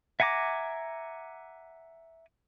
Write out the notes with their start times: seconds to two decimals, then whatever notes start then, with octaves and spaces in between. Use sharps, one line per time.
0.20 E5 F#5 G#5 A#5 D6